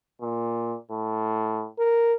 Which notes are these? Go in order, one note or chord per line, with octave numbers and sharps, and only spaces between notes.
A#2
A2
A#4